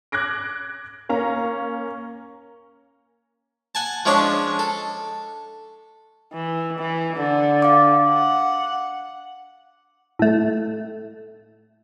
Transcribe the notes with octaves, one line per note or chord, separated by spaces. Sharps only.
D6 F#6 G#6 A#6 D7
A#3 C#4 F5 A#5
F#5 G#5 A5
F3 G#3 C#4 D4 C#5
A4
E3
E3
D3
F5 D6
F#5
A2 A3